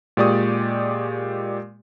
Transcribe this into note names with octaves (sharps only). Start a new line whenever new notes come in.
A#2 G#3 G4 D5 C#6 D#6